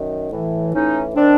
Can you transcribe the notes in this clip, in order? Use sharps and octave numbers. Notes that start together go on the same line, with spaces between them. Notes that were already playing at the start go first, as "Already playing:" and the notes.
Already playing: F#2 D#3
A2 E3
A2 E3 C#4 D#4
D#3 C4 D4